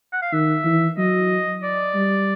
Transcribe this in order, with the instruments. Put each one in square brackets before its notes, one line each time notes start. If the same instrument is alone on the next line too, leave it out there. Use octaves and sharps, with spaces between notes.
[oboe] F#5
F5
[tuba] D#3 [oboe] E5
[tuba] E3
[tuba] F#3 [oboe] D#5
[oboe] D5
[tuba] G3